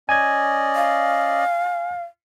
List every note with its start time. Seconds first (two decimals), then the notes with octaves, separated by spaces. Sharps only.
0.09 C#4 D5 D#5 G#5 G#6
0.76 F5